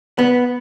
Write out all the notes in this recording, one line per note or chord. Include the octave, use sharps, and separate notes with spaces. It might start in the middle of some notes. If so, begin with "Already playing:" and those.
B3